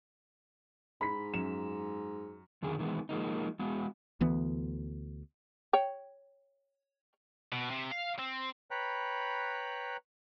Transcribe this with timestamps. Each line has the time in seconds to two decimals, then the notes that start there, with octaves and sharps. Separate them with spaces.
1.01 G#2 B5 B6
1.34 F#2 E7
2.62 F2 D3 D#3 G#4
2.79 D#3 E3 G#3 A#3 B3
3.09 F3 G#3 A#3 D#4
3.59 G#3 B3 F#4
4.21 D2 E3 B3
5.73 C#5 G5
7.52 B2
7.70 C3
7.92 F5
8.19 C4
8.71 B4 C#5 G5 A#5 B5 F#6